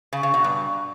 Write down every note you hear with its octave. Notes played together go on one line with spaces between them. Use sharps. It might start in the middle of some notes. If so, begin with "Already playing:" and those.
C#3
C#3
B2
G2